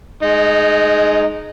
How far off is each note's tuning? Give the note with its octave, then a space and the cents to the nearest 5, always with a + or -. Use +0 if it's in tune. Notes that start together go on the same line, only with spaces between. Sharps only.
G#3 +20 D#4 -10